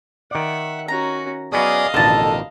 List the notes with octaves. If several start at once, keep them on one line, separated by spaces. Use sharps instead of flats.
D#3 D5 E5 F#5
C#4 F#4 A#5
F#3 B3 C#4 G#4 D5 D#5 F5 D#6
A1 F2 B2 D3 D#3 A4 A5